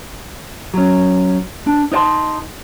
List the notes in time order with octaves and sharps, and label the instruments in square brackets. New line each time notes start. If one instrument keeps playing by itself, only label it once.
[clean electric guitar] F#3 C#4
D4
D#4 C5 D5 A5 C6